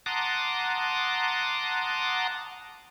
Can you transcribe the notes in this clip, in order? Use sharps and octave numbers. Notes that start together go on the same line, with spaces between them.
F#5 A5 A#5 C6 D6 D#6